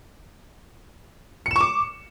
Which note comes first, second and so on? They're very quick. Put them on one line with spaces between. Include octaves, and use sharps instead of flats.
C#7 E7 C#6 D6